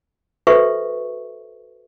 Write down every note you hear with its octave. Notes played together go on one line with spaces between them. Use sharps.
F#4 A4 B4 C5 E5 C#6